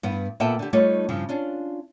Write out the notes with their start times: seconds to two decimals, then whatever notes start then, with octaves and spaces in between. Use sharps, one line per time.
0.03 G2 B3
0.40 A#2 B3 A4 E5 G5
0.59 D3 G4
0.73 G3 A3 D#4 F4 C#5
1.09 G2 C#3 F3
1.29 C#4 D4 F4